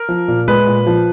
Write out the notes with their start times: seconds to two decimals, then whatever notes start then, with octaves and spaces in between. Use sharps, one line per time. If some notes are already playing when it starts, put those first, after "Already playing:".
Already playing: A#4
0.09 F3
0.28 A#2
0.48 G#3 B4
0.67 A#2
0.87 F3